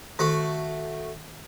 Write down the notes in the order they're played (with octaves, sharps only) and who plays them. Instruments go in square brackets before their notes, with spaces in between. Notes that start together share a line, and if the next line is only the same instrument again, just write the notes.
[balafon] D#3 [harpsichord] A3 F#4